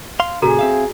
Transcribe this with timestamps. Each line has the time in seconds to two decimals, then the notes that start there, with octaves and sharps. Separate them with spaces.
0.20 F5 C6
0.42 A#2 C#3 F#4 G#4 A4 A#5
0.59 C4 E5 F5